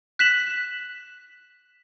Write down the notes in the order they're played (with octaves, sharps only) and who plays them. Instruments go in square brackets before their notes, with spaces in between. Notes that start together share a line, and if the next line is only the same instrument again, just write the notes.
[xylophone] F#6 B6 E7 F#7